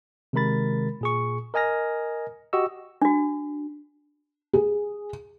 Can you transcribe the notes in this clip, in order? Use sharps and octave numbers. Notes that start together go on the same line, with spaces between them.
C3 D#3 G#3 A#4 B5 A6
A#2 G#4 C#6
A#4 D#5 G#5 F6 A#6
F#4 G4 D#5 C#6 E6
D4 F#4
G#4